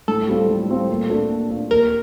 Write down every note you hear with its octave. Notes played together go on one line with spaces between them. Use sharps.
A2 A4
G3 C4 F4
A2
G3 C4 F4
A#2
A3 D4 F4
A#2
A3 D4 F4
D#2 A#4